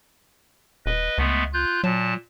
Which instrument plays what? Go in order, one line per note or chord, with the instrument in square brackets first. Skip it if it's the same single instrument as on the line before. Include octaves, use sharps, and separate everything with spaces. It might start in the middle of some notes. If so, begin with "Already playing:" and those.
[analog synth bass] D#1 [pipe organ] B4 D#5
[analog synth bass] C#2 [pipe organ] G#3 A3 B3
[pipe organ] F4 F#6 G6
[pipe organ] A#2 A5 [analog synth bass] F#3